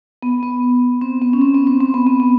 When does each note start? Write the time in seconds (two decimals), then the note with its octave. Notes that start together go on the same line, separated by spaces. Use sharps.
0.22 B3
0.43 B3
1.01 C4
1.22 B3
1.33 C#4
1.41 C4
1.54 B3
1.67 C4
1.80 C4
1.94 B3
2.07 B3
2.20 B3